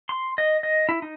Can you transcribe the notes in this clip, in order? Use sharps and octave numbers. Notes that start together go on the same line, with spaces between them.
C6
D#5
D#5
E4
D#4